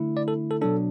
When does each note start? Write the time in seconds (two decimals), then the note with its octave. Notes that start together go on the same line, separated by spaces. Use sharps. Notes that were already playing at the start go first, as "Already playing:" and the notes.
Already playing: D3 A3 E4
0.17 D5
0.28 A4
0.51 A4
0.61 B2 F#3 D4 A4